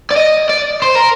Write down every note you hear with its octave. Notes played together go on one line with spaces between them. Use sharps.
D5
D#5
D5
C5
A#4